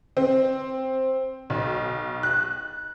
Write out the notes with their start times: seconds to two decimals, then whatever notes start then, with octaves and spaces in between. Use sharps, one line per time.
0.17 C4
1.50 B1
2.23 F#6